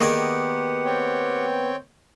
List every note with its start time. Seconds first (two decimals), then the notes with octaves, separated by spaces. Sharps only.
0.01 D#3 A#3 B3 G4 G#4 A#4 D5 F#5
0.85 C4 C#5 G5